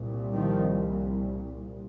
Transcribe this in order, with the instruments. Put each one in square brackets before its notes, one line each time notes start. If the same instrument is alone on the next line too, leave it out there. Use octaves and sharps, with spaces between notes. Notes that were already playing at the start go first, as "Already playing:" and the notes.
Already playing: [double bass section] C2 A#2
D#3 F3